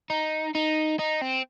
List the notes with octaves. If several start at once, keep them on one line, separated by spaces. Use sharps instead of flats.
D#4
D#4
D#4
C4